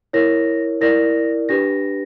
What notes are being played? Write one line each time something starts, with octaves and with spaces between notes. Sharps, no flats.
E4 A#4 C#5 A#6
E4 A#4 D5 A#6
D4 G4 B4 A#6